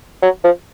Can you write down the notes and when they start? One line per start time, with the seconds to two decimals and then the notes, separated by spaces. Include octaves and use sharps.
0.22 F#3
0.44 F3